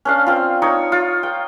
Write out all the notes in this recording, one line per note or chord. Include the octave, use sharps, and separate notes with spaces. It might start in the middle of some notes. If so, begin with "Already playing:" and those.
C#4 D4 F5
C4 F4
D#4 C#5
F4
G5